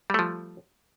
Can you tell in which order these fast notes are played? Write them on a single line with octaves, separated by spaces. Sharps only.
G3 A3 F3